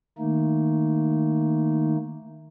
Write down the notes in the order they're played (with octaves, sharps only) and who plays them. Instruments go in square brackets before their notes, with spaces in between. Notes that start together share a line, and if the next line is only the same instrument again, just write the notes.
[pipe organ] D#3 A3 A#3 D#4